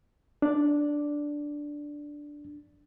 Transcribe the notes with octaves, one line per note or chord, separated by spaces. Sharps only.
D4 D5